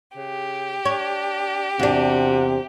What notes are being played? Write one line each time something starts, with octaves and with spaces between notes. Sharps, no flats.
C#3 G4
D4 C#5
E2 C3 D4 F#4